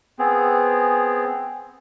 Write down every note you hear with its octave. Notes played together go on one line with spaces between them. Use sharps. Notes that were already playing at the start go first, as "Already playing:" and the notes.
B3 C4 G#4